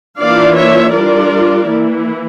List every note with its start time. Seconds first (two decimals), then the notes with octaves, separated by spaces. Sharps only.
0.20 E3 A#3 D4 F4 D5 F5
0.56 C#5 E5
0.94 G3 D4 F4 A#4 D5
1.68 E3 A#3 E4